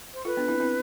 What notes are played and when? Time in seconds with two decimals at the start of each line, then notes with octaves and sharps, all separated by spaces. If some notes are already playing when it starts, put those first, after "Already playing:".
0.13 C5
0.25 F4 A4 B4
0.37 B3 D4
0.48 C4 E4
0.60 C4 E4